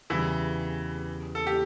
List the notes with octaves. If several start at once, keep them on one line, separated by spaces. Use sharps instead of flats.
E2 C#3 E3 G3 E4
A4
G4